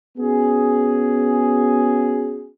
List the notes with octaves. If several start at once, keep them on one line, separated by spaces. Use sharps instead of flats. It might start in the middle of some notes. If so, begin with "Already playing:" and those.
B3 C#4 F#4 G#4